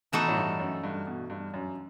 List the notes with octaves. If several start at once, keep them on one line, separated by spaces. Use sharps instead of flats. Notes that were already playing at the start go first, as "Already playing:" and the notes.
B2 E3 A3 D#4 F#4 A4
A2
G2
F#2
G2
B2
G2
F#2